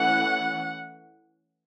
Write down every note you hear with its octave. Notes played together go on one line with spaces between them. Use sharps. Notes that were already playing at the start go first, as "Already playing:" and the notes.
Already playing: E3 A3 C#4 F#5